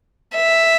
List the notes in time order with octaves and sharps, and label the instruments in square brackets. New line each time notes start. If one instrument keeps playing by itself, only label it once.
[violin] E5